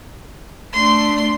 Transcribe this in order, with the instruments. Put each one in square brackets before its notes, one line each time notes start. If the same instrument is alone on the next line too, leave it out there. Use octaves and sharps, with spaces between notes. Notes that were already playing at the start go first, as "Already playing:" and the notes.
[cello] A3 D4 [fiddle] C6